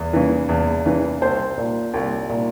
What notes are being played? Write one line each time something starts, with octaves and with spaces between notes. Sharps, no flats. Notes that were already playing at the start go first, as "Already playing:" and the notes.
Already playing: E2
C#3 E3
E2
C#3 E3
C2 C5
A#2
C2
A#2